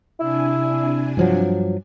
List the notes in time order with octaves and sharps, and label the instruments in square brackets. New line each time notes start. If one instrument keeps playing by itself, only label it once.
[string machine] C3 D4 G#5 [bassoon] E4
[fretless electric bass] G2 F3 F#3